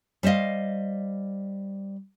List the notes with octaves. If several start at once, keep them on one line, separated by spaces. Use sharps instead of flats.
G3 C5 C#5 D#5 F5